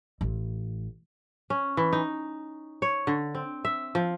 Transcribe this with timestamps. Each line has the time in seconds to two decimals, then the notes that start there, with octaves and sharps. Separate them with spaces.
0.21 A1
1.50 C#4
1.77 E3
1.93 D#4
2.82 C#5
3.07 D3
3.35 C4
3.65 E5
3.95 F3